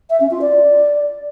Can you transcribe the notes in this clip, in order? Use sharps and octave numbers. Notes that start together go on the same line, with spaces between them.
E5
C#4
F4
D5